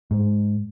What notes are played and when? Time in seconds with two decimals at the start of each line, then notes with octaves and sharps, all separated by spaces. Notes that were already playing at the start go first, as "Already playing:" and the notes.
0.11 G#2